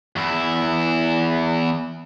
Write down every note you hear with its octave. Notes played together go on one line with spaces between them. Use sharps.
E2 E4